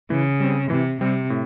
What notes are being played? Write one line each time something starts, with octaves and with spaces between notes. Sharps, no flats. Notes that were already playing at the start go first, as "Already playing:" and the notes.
C#3 E3
G3 C4
C3 E3
C3 G3 C4
A2